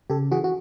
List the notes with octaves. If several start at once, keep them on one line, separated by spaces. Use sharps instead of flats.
C#3 G4 A4
E3 F#4 G#4
F#4